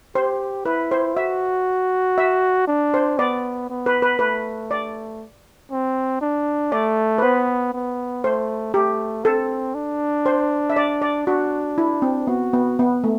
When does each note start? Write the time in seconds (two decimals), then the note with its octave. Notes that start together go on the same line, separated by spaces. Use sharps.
0.15 G4 C5
0.65 E4 B4
0.91 C5
1.16 F#4 E5
2.18 E5
2.67 D4
2.94 C5
3.18 B3 D5
3.70 B3
3.86 B4
4.02 B4
4.19 A3 B4
4.71 D5
5.72 C4
6.21 D4
6.72 A3 D5
7.18 B4
7.22 B3 C5
7.73 B3
8.24 A3 C5
8.74 A3 G4
9.25 C4 A4
9.75 D4
10.26 C5
10.70 E5
10.76 D5
11.02 D5
11.27 D4 F#4
11.78 E4
12.02 C4
12.27 B3 F#4
12.53 B3
12.79 B3
13.04 A3